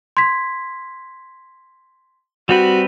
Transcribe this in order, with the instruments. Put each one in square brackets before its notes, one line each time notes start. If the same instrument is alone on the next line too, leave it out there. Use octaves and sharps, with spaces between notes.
[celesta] C6 G#6 B6
[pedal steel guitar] G3 C4 B4 [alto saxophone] F#4